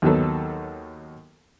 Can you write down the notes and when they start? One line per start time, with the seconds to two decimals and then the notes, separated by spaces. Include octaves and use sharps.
0.02 D#2 D#3 F#3 B3 A4